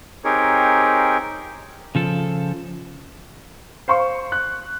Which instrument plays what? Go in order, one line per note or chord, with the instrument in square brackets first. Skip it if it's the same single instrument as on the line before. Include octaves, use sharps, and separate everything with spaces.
[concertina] C4 D#4 G4 G#4 A#4 C#5
[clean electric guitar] C#3 F3 A4
[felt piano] C5 F5 C6 C#6
F#6